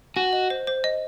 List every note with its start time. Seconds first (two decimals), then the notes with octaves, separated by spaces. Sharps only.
0.16 F#4 G#5
0.33 D#5
0.50 C5
0.67 C5
0.84 D#5